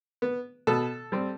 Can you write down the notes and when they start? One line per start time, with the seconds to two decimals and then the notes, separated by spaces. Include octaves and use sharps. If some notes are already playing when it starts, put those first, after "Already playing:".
0.22 B3
0.67 B2 A4
1.12 G3 C4